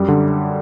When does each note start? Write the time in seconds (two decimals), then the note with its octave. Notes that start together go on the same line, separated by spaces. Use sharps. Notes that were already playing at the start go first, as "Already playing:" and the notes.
Already playing: F#2 G3
0.08 D3